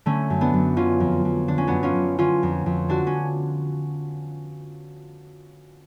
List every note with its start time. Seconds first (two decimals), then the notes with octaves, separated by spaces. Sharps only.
0.06 D3 A3 C#4
0.30 F#2
0.41 B3 D4
0.54 F#2
0.77 D3 C#4 F4
1.00 F2
1.25 F2
1.48 D3 D4
1.58 C#4
1.67 F#2 B3 D4
1.83 C#4 F4
1.95 F#2
2.18 D3 C#4 F4
2.43 F2
2.66 F2
2.88 D3 D4 F#4
3.07 C#4